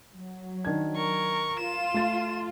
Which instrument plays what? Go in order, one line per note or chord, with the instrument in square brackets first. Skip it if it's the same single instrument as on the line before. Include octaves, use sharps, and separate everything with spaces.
[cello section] F#3
[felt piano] D#3 D4 G#6
[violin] A#4 C#6
[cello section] F4 [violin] E7
[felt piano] A3 A6